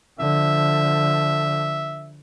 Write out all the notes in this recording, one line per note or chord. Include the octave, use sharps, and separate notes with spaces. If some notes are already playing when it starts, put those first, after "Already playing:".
D3 F3 E5